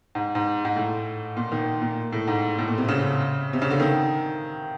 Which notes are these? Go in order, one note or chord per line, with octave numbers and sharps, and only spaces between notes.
G#2
G#2
G#2
A2
A#2
D#3
A#2
A2
G#2
A2
A#2
C3
C#3
C3
C#3
D3
D#3